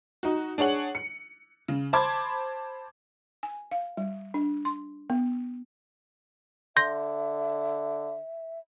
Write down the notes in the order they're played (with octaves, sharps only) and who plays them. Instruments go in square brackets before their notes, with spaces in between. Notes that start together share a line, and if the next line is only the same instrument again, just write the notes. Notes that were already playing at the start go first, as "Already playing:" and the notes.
[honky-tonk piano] D#4 F#4
D4 G#4 C#5 F#5 F#7
C#7
C#3
C5 A5 B5 C6 D6 G#6
[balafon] G#5
F5
G3
D4
C6
B3
[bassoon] D3 [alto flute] E5 [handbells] C6 G6 A#6